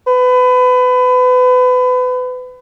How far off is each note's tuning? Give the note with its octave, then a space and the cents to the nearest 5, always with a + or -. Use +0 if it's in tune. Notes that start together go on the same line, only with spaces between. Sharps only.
B4 +30